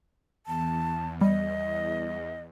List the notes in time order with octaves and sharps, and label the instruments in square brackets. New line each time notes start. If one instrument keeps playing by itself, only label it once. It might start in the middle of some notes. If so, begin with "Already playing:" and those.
[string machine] E2 [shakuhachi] A5
[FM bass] G3 [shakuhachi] D#5